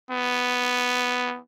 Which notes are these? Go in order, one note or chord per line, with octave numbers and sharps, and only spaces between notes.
B3